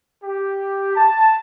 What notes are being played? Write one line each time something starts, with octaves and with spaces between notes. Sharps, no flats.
G4
A5